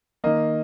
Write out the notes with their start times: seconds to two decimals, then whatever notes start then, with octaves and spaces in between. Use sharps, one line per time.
0.24 D#3 A#3 D#5